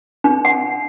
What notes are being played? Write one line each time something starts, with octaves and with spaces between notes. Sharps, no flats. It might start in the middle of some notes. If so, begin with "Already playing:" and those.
D4
F#5